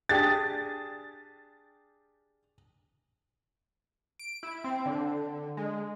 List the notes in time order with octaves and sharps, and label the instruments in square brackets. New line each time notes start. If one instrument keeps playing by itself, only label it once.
[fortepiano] D4 G4 G#4 [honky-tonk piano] A6
[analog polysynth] D7
E4
C4
D3
G#3